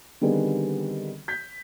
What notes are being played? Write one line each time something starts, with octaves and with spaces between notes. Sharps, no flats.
D3 D#3 G3 B3 C4 G#4
G6 B6